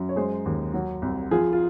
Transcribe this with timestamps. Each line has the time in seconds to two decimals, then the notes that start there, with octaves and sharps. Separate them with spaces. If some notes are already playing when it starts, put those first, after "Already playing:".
Already playing: F#2
0.09 C#5
0.16 G#3 G#4 C5
0.46 D#2
0.73 F#3
1.02 C2
1.31 F3 F4 G#4
1.53 F4